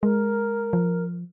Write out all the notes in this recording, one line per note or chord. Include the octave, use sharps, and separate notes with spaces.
G#3 A#4
F3